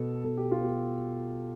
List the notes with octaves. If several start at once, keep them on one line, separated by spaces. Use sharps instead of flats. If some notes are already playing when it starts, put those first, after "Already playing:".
Already playing: B2 B3 A4
B2 A4
G4
F4
B3 G4